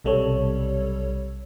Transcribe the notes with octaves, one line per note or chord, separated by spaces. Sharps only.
B1 C3 G3 A4 C#5